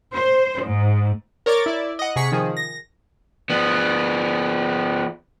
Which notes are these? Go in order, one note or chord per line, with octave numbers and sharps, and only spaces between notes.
C5
G#2
A#4 C#5 D5 D6 A6
E4 D5
D#5 F#5
C3 G#4 C#6 B6 C#7
D#3 F3 G#4
A#6
F3 B3